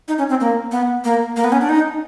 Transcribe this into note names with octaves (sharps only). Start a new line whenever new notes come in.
D#4
C#4
C4
A#3
B3
A#3
A#3
B3
C#4
D4
D#4